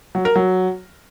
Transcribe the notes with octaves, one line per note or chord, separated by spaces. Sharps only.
F#3
A#4
F#3